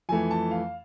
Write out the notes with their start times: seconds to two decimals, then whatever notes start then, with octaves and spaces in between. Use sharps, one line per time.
0.09 F2 E3 A3 G#5
0.31 A5
0.51 F5